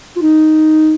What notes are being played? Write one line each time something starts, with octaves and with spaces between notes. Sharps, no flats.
F4
D#4